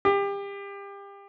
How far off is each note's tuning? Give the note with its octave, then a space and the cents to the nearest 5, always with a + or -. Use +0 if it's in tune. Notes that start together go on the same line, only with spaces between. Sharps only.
G4 +30